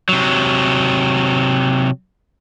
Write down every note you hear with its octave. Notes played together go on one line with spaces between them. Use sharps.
C3 F#3